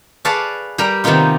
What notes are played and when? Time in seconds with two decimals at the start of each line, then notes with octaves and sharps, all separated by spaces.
0.25 G#4 B4 C#5 D5 F5 A5
0.78 G3 G4 A#4 A#5
1.04 C3 D#3 A#3 B3 D#4 F4